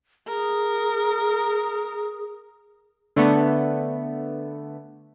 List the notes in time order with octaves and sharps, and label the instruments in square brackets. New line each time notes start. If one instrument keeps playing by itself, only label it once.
[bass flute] G#4 [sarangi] A#4
[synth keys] D3 A3 B3